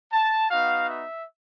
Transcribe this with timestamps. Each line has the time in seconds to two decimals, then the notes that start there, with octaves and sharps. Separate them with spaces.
0.13 A5
0.51 B3 D#4 F#4 F5
0.90 E5